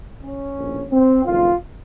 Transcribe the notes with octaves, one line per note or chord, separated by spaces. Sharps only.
C#4
A#1 A2
C4
F#1 F2 D#3 F4